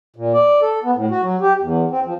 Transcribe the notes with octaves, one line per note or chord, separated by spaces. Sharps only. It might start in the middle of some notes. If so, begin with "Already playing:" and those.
A#2
D5
A4
B3
A2
F#4
F#3
G4
E2
C4
F3